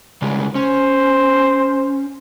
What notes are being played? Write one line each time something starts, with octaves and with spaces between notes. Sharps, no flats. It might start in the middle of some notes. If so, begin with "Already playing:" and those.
C#3 G3 G#3
C#4 C5